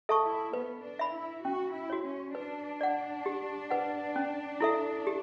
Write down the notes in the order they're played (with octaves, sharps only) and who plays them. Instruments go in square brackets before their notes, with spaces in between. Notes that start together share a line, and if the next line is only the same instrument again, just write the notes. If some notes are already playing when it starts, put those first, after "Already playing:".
[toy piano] A4 E5 A5 C#6
[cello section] E4
[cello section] B3 [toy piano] B4
[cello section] D4
[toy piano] E5 B5
[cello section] E4
[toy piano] C#4 [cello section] F#4
[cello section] E4
[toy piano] F#4 C#5
[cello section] C#4
[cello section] D4 [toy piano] B4
[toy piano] D5 F#5
G4
B4 F#5
C#4
E4 A4 E5
G4